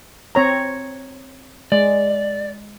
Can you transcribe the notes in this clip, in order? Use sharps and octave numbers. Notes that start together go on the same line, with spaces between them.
C4 C#5 A#5
G#3 D5